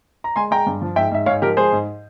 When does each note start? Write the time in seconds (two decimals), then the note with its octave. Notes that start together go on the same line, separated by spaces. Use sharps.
0.24 A#5
0.36 G#3 G#5 C6
0.51 G#3 G5 A#5
0.66 G2
0.81 F3
0.96 G#2 E5 G5
1.11 G#2 E5
1.26 G#2 C#5 F5
1.42 F3 G4 A#4
1.57 G#3 G#4 C5
1.72 G#2